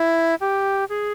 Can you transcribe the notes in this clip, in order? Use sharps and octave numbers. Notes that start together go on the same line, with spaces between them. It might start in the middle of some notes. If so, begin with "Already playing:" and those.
Already playing: E4
G4
G#4